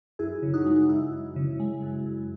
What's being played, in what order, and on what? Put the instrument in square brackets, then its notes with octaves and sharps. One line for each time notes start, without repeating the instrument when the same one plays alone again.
[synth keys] F#2 E4 G#4
C#3
D#4 F#4
G#3
F#2 E4
F#2
C#3
G#3
F#2
F#2